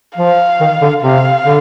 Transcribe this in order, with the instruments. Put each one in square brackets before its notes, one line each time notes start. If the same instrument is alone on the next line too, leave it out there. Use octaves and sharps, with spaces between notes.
[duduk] F3 [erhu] F5
[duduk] D#3
D3
[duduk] C3 [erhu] F5
[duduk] D3